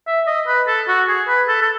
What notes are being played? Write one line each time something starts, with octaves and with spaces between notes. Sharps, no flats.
E5
D#5
B4
A4
F#4
G#4
B4
A4
A4